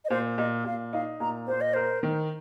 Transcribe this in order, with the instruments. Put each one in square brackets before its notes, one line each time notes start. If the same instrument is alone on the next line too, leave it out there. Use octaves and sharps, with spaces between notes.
[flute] D#5
[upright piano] A#2 [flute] C5
[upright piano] A#2 [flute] D#5
[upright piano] A#2 [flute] F5
[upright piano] D#4 [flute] F5
[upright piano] A#2 [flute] A#5
[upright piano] A#2 [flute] C5
[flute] D#5
[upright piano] A#4 [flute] C5
[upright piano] D#3